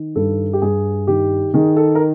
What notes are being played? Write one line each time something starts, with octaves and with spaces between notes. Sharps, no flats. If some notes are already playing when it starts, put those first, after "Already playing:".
Already playing: D#3
G2 A4
G4
G2 G#4
D#3 G4
D#3 G#4
A4
A#4